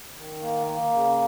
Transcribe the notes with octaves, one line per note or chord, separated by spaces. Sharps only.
D#3
A#3
A#3
C#3